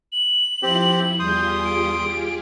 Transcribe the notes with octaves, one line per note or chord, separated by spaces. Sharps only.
F#7
F3 C4 E4 G4
E2 G3 F4 G4 G#4 C6 D#6 G6
D7